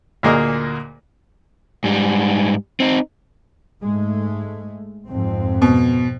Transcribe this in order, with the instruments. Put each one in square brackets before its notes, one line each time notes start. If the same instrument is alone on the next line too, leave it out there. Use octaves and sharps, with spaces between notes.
[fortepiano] D2 A#2 A#3 G#4 A#4 D#5
[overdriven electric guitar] G#2 G3
C4 D#4
[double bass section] G#2 G#3 A3
F2 G#2 C4
[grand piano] B2